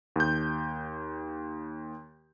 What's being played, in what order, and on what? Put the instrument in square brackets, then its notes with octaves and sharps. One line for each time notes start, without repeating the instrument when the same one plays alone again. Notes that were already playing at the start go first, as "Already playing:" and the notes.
[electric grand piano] D#2 G6